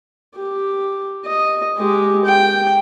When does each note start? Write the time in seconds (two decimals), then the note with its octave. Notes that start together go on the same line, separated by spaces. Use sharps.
0.35 G4
1.25 D#5
1.77 G#3 G4
2.25 G5